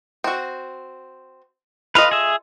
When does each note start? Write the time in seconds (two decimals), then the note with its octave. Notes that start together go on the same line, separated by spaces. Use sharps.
0.24 C4 F#4
1.95 F4 A4 B4 D#5 F5
2.11 G#4 E5